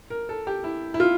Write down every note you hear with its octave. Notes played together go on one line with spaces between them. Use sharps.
A#4
A4
G4
E4
E4
F4